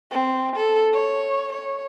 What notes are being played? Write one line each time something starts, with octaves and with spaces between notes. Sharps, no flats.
C4
A4
C#5
C#5